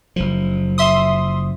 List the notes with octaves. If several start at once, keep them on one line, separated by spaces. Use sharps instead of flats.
F#1 F3
E5 C6 D#6